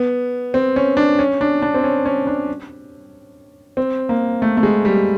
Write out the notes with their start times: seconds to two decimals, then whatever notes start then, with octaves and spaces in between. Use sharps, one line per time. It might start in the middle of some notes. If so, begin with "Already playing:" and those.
Already playing: B3
0.54 C4
0.76 C#4
0.97 D4
1.19 C#4
1.41 D4
1.62 D4
1.74 C4
1.84 C#4
2.06 C#4
2.27 D4
3.77 C4
4.09 A#3
4.42 A3
4.57 A3
4.63 G#3
4.85 G3